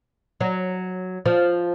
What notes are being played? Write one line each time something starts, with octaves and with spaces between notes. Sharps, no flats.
F#3
F3